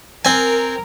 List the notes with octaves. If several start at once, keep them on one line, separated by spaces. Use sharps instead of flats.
C4 A#4 G#5